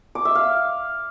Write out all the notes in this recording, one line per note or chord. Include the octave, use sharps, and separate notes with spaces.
D6
E5
F5